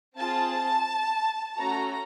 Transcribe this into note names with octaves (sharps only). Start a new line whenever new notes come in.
C4 F4 G#4 A5
A3 C#4 F#4 A4 A#5